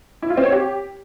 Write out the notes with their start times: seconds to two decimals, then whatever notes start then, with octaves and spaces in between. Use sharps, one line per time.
0.22 E4
0.30 F4
0.37 C4
0.45 C#5
0.52 G4